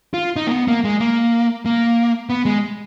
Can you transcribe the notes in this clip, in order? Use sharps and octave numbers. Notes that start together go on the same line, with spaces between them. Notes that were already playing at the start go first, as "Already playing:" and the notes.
F4
D#4
A#3
B3
A#3
G#3
A#3
A#3
B3
G#3